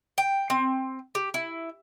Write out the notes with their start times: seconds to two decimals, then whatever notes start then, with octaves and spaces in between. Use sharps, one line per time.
0.18 G5
0.50 C4
1.15 G4
1.34 E4